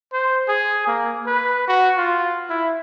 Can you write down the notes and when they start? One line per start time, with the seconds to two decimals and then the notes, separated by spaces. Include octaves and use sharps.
0.13 C5
0.48 G#4
0.87 A#3
1.26 B4
1.68 F#4
1.97 F4
2.50 E4